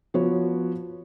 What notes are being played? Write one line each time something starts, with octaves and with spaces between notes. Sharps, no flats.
F3 B3 F#4 C#5